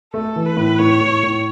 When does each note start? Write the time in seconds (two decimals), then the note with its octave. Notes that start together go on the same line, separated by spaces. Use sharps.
0.14 A3 A4
0.36 E3
0.46 B4
0.57 A2
0.79 A2 C#5
1.01 A2
1.23 A2